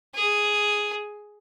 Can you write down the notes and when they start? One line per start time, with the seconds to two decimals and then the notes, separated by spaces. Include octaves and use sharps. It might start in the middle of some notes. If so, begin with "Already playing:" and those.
0.15 G#4